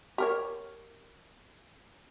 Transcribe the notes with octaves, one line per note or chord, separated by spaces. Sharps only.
G4 A#4 C#5